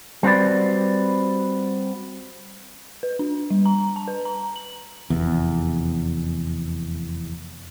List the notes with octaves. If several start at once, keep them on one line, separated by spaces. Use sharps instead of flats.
G3 C4 F#4 B4 D5
B4
D4
G3
A#5
A5
B4
A#5
F#7
F1 E2